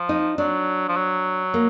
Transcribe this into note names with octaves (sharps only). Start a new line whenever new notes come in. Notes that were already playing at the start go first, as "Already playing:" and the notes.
Already playing: F3
D#4
F#3 D4
F3
F#3
A#3